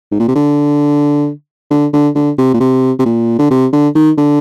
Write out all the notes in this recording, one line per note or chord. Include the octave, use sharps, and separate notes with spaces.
G#2
A#2
C3
D3
D3
D3
D3
C3
A#2
C3
C3
A#2
D3
C3
D3
D#3
D3